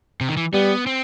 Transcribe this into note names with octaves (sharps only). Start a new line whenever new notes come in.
C3
D#3
E3
G3 B3
C4